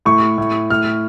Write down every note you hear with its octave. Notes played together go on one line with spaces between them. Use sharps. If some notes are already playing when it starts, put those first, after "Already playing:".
A2 C#6
A2
A2 F6